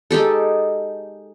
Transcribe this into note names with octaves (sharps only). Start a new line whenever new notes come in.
G#3 D#4 G4 A4